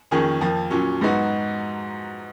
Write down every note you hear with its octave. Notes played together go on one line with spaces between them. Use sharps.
F2 D#3 A#3 C#4 G#4
F2 F3 A#3
A#2 F#3 C#4
G#2 F#3 B3 D#4 F#4